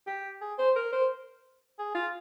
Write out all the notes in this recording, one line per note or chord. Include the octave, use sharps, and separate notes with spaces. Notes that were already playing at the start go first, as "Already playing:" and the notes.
G4
G#4
C5
A#4
C5
G#4
F4